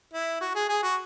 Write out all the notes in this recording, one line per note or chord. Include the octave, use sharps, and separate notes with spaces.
E4
F#4
G#4
G#4
F#4